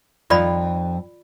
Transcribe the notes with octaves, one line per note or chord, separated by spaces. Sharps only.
F2 D#4 F4 D5 B5